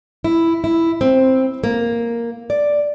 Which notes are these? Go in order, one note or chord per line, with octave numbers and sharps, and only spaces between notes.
E4
E4
C4
A#3
D5